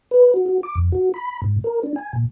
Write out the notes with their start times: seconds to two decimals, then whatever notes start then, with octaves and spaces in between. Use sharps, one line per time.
0.11 B4
0.34 F#4
0.46 F#4
0.63 D6
0.75 F2
0.92 F#4
1.14 B5
1.42 G#2
1.64 A#4
1.83 D4
1.96 G#5
2.13 A#2